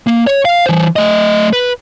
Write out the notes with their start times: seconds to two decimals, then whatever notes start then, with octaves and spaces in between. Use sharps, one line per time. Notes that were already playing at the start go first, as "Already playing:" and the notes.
0.07 A#3
0.27 C#5
0.45 F5
0.66 E3 C5
0.96 A3 D#5
1.53 B4